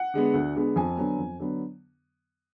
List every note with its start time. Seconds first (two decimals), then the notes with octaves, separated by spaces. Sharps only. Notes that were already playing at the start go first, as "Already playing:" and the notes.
Already playing: F#5
0.14 D3 G#3 B3
0.34 D2
0.56 D3 G#3 B3
0.76 F2 G#5
0.97 D3 F#3 B3
1.18 F2
1.39 D3 F#3 B3